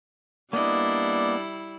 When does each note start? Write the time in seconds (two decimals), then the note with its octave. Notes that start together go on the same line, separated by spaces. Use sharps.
0.53 G3 A#3 B3 D4 E4 D#5